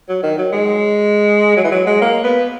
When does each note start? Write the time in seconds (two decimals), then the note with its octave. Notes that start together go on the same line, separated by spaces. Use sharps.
0.08 F#3
0.23 D#3
0.38 F#3
0.52 G#3
1.57 F#3
1.64 E3
1.71 F#3
1.86 G#3
2.01 A#3
2.23 B3